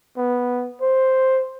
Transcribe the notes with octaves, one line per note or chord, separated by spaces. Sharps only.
B3
C5